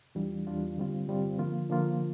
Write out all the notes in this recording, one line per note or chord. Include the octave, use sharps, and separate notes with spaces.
E2 E3 G3 D4 F4
E2 E3 G3 D4 F4
G2 D3 G3 C4 F4
G2 D3 G3 C4 F4
D3 F3 A#3 F4
D3 F3 A#3 F4